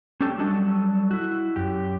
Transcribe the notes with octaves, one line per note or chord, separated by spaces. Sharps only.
C#4 D4 G4 A4 G5 A5
F#3 G3 F#4 A4 D#5 A5
E4 F#4
F#2 G4